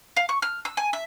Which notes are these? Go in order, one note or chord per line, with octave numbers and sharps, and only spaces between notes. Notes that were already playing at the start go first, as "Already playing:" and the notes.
F5
C#6
F6
E6
G#5
E5